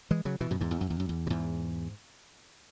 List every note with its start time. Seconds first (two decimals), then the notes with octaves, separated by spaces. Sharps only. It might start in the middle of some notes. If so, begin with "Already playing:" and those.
0.11 E3 G#3
0.25 C#3 F#3
0.41 B2 E3
0.51 F#2 B2
0.61 E2 G#2
0.71 E2
0.81 F#2
0.90 E2
1.00 F#2
1.09 E2
1.27 B2
1.30 E2 G#2